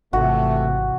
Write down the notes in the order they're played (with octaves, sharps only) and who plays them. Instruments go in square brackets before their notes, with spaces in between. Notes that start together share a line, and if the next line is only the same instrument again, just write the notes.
[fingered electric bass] G#1 [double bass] C3 E3 [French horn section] A3 [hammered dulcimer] F#4